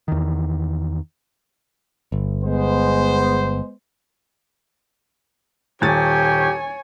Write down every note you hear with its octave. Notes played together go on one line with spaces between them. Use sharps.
E2 D#3
G1
G#3 B3 C5
D#1 G4 C#5 G#5 A6